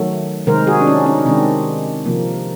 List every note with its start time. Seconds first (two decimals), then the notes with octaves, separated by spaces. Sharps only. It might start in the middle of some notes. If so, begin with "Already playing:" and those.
Already playing: D#3 F#3 A3
0.47 C3 D#3 G#3 A#4 C5
0.67 F#4 G#4
0.81 D4
0.87 C#4 D#4
1.06 C#4 D#4
1.19 D#4
1.25 C3 D#3 G#3 C4 D4
2.05 C3 F3 A#3